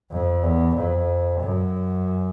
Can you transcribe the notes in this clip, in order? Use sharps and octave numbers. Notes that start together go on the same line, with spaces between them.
F2
E2
F2
F#2